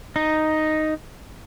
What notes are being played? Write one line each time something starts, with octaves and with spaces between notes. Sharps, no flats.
D#4